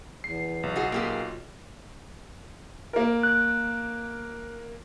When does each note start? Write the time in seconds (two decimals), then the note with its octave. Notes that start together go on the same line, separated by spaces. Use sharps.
0.24 E2 C7
0.63 B1
0.76 F4 F#4 G#4
0.92 A#3 F4 G4 G#4
2.93 A#3 A#4
3.23 F#6